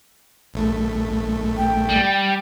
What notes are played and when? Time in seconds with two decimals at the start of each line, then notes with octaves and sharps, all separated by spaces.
0.54 A#1 A3
1.57 G5
1.89 G3